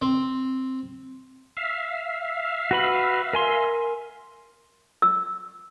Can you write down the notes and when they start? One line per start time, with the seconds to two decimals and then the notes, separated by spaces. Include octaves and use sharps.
0.02 C4
1.57 E5 F5
2.71 F#4 B4 B5
3.33 A#4 G#5 C6
5.02 E6